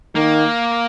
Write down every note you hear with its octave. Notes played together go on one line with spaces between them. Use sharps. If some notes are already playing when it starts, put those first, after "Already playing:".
D#3 A#3